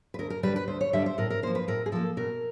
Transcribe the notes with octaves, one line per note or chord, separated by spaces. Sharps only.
B4
D2 A#4
A#4
D3 G3 B4
B4
D2 C5
C#5
D3 G3 E5
C5
A2 A#4
A#4
F3 A#3 C5
B4
A2 A#4
G#4
F3 A#3 A4
B2 A#4